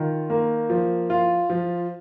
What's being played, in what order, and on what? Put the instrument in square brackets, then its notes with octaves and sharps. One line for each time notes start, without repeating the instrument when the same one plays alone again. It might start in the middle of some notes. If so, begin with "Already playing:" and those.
Already playing: [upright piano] D#3 F4
A#3
F3
F4
F3